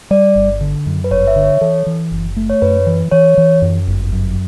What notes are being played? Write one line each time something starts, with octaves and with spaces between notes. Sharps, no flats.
G3 D5
G1
D3
F#2
B4
G1 C#5
E5
D3
C#5
E3 A4
E3
F#1
A3
C#5
F#2 B4
E3
E3 C#5
E3
F#2
G1
F#2